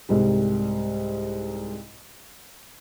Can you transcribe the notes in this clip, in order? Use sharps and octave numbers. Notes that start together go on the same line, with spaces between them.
C2 G#2 G3